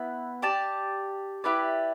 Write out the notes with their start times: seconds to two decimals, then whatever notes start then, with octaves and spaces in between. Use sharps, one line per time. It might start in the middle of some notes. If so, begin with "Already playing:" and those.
Already playing: B3 E4 B4
0.42 G4 D5 A5
1.44 E4 G4 B4 D5